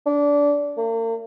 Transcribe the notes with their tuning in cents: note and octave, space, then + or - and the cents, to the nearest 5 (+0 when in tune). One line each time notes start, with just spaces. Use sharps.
D4 -20
A#3 -40